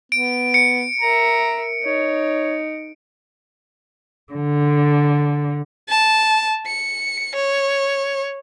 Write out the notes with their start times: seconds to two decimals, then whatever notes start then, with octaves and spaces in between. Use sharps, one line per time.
0.12 B3 D7
0.54 C#7
1.01 A#4 E5 A#5
1.83 D#4 C#5
4.33 D3
5.89 A5
6.66 C#7
7.35 C#5